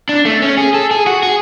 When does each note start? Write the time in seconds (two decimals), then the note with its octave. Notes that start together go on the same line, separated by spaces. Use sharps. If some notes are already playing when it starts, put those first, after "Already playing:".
0.09 D4
0.25 A3
0.42 C#4
0.58 G#4
0.74 A4
0.91 G#4
1.07 F#4
1.23 G#4